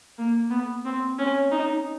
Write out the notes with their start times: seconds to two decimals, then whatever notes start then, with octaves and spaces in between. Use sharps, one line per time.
0.18 A#3
0.51 B3
0.85 C4
1.18 C#4
1.52 D#4